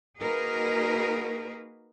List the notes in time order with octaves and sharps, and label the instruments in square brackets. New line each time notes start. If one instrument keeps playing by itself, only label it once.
[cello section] A#3 D#4 F#4 G#4 A#4 B4